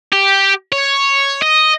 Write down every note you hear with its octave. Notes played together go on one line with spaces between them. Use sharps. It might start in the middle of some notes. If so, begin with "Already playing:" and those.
G4
C#5
D#5